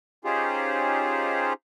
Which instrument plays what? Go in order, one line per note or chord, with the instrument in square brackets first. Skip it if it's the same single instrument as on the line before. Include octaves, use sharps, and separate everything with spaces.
[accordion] C#4 D#4 F4 G4 G#4 C5